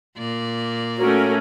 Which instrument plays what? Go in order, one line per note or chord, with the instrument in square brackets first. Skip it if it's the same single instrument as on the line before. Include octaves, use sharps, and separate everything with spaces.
[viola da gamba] A#2 A#3 D5
[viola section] A3 C#4 A#4 [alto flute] F#4